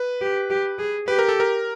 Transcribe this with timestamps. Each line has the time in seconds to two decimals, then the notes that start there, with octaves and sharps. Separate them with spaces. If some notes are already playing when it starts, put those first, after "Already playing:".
Already playing: B4
0.21 G4
0.50 G4
0.79 G#4
1.08 G4 B4
1.19 A#4
1.29 A4
1.40 A#4